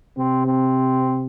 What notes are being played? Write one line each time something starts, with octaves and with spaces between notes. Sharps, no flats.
C3 C4
C4